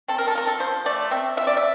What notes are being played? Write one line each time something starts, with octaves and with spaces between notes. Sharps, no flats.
C4 A4
A#4
A4
F4 A#4
A4
F3 C5
A3 D5
C4 E5
F4 E5
D5
E5